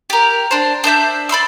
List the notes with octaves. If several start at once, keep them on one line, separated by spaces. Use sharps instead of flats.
G4 A#4
D4 C5
D4 C5 E5 G6
D5 B5 C6 E6